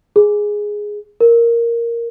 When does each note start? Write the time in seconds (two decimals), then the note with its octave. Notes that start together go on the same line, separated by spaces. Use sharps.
0.16 G#4
1.20 A#4